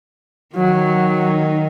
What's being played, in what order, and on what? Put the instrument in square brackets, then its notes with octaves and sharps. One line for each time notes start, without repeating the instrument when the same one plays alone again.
[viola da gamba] D#3 [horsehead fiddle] F#3